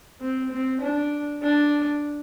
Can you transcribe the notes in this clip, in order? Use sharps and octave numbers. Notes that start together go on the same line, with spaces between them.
C4
C4
D4
D4